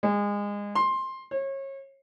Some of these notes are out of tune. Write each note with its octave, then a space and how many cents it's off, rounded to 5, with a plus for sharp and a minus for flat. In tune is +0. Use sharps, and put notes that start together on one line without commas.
G#3 -25
C6 +15
C#5 -30